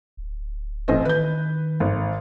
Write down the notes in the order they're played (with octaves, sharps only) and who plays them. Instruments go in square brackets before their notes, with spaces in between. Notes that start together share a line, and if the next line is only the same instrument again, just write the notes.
[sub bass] D1
[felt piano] A1 C4 D#5
[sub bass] D#3 [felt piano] B4 G6
[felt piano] G#1